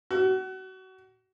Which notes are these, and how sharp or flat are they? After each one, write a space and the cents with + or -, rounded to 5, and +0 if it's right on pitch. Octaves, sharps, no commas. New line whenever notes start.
F#4 +30